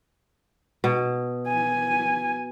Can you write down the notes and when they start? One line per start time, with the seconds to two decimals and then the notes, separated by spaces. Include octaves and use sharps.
0.84 B2
1.48 G#5